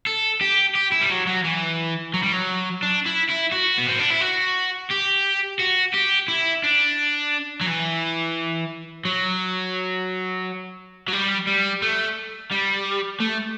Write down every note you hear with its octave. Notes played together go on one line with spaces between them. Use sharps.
A4
G4
G4
E4
G3
F#3
F#3
E3
F#3
G3
F#3
D4
E4
E4
F#4
B3
C4
D4
E4
F#4
G4
F#4
G4
E4
D4
F#3
E3
F#3
F#3
G3
G3
A3
G3
A3